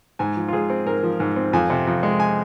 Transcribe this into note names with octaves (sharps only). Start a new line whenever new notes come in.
G#2 G#5
F3
F4
G#2 G#4
C4
G#2 A#4
F3
G#2
C4
F2 G#5
C3
F2
G#3
G#5